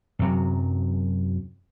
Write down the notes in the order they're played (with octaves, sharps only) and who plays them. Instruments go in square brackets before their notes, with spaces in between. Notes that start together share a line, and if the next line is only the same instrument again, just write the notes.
[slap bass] F#2 C3 F#3